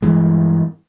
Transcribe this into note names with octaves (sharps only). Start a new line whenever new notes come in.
G2 E3 G#3